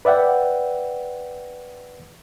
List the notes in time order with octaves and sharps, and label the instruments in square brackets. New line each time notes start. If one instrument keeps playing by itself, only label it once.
[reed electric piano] B4 D5 E5 F#5 G5